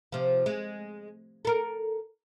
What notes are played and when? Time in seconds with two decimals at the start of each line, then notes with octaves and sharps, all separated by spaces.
0.12 C3 F3
0.46 G#3
1.45 A4 A#4